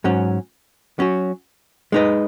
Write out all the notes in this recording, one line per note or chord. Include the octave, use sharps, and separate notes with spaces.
G#2 F#3 C#4
F#3 C#4 F#4
G#3 D#4 B4 D#5